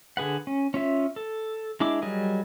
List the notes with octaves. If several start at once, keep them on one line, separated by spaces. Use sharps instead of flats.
D3 G#4 B4 F#5
C#4
C#4 F4 E5
A4
G#3 D4 E4 D6
F#3 G3 G#4 A#4 D#5